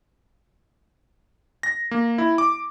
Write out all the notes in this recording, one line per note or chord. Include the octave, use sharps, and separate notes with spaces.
A#6
A#3
E4
D6